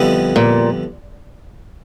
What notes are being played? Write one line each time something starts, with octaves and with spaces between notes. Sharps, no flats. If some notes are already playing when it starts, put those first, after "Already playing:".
Already playing: F2 D3 G3 B3 E4
A#2